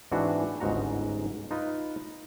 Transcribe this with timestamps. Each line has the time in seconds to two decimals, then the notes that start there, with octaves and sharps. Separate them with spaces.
0.12 G#2 E3 C4 D4 F#4
0.60 G1 C#2 G#2 D#4 F#4 A#5
1.51 D#4 F4 B4